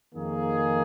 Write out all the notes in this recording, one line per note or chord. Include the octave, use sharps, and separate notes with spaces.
F2 D#3 A#3 G#4